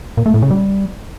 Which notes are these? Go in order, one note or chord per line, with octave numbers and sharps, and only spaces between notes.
A#2
A3
A2
C#3
G3